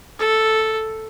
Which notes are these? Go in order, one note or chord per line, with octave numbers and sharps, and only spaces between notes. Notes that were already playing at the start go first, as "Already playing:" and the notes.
A4